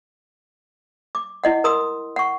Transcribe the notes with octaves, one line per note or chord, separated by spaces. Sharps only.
D6
E4 D#5 F#5
A#4 A#5 C6 D#6 E6
F#5 C#6